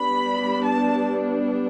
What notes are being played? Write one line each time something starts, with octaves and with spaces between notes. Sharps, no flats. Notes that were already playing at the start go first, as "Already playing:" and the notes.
Already playing: G3 B3 D4 B5
A5